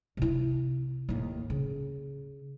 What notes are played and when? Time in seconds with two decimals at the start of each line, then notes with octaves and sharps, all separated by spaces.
0.17 C3 E4
1.09 D#2 A2
1.50 C#3